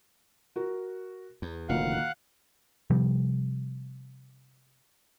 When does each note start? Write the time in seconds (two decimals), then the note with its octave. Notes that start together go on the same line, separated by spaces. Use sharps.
0.56 F#4 A#4
1.42 E2
1.69 F1 D2 A#2 D#3 F5 F#5 F#6
2.90 C3 F3 G3